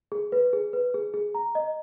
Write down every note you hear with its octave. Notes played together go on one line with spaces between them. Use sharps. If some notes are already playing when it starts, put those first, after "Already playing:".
G#4
B4
G#4
B4
G#4
G#4
A#5
D#5